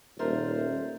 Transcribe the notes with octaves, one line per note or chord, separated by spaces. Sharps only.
D#1 A3 A#4 C5